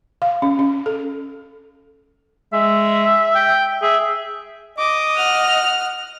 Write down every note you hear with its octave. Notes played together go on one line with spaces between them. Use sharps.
F5
C#4
C#4
A4
G#3 E5
G5
G#4 E5
D#5 D6
F#5 F6